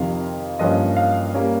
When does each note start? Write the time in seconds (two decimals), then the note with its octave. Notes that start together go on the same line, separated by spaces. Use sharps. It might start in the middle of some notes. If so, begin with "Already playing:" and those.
Already playing: F2 C3 D#3 F5
0.59 G2 F3 A#3 C#4 D#5
0.96 F5
1.34 G3 A#3 C#4